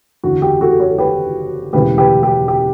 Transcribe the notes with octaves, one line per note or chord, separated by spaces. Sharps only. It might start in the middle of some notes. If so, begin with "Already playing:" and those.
F#1 E2 D3 F#4
G4
F#4 A4
A4 C#5
G4 B4
E1 D2 C#3 E3 G4 B4
G4 B4
G4
G4